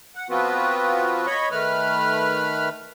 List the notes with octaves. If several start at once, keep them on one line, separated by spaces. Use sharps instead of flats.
F#5
F3 B3 C4 F4 F#4 B4
C#5 D#5 B5 C#6
D#3 A3 B4 B5 F6